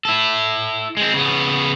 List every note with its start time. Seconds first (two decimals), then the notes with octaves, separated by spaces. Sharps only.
0.05 E4 A4
0.97 G#3 C4
1.14 C#3 B3